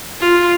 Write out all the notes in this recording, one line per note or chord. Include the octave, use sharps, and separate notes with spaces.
F4